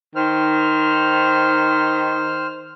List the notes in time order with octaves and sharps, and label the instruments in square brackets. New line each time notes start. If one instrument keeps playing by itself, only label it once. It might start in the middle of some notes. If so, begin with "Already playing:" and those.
[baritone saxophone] D#3 [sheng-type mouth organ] C5 F6